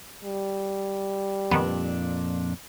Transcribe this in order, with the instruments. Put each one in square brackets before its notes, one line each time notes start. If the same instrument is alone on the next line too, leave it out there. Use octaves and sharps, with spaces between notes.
[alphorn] G3
[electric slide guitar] F2 A#2 D4 [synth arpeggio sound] D#3 B3